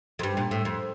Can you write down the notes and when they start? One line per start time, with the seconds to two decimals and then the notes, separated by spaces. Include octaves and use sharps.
0.19 F2
0.23 G2
0.37 A#2
0.51 A2
0.65 F2